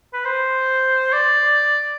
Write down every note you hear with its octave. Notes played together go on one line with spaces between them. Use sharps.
B4
C5
D5